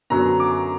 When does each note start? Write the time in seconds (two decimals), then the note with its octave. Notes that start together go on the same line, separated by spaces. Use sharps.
0.10 F#2 D3 F#3 B3 A#5
0.40 D6